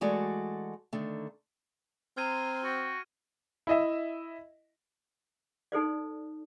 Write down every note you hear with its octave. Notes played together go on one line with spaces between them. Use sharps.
E3 G#3 A3 F#4 D5
D3 D#3 A3
C4 A#5 C6 F6 G#6 D#7
F#4 G5
E4 D#5 E5
D#4 A4 C5 D5